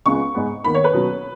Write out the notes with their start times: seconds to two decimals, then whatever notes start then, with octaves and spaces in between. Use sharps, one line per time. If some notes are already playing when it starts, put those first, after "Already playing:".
0.06 C#2 C#3 G#3 B3 C#6
0.34 G#2 G#3 B3
0.64 D#2 D#3 B3 B5
0.74 C#5
0.84 B4
0.93 B2 F#3 C#4